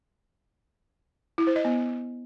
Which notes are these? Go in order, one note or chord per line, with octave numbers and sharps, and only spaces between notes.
E4
C5
D#5
B3